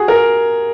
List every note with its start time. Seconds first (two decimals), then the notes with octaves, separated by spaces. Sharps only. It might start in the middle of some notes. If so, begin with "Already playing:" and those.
Already playing: F#4 G#4
0.08 A#4